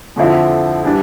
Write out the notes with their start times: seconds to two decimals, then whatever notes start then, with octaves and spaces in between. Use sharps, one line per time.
0.16 F2 D3 F3 C4 E4
0.83 E3 G3 D4